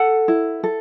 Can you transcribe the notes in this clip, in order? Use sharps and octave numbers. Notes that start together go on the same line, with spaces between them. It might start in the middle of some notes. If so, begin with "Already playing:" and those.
Already playing: A4 F#5
E4
A4